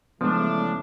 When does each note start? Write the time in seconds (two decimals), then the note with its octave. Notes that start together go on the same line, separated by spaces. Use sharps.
0.21 C#3 E3 F3 G#3 A3 B3 D4